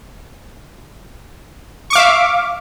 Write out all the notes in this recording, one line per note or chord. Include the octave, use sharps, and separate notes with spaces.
E5 F5 C#6 D6